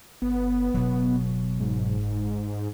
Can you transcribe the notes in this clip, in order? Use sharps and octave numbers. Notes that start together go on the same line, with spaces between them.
G1 B3
F#1 B2 F#3
G#2